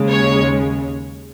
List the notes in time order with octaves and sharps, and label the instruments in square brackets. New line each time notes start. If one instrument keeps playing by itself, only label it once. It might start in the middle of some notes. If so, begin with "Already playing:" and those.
Already playing: [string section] D#2 C#3 G#3
C#5